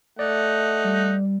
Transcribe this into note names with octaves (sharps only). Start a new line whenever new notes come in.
A3 D#4 D5 F#5
G3